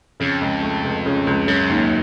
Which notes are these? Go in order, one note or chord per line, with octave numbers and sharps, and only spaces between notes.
F2 C#3
C#2
A3
C#2
C#3
C#2
F#2 C#3
D#2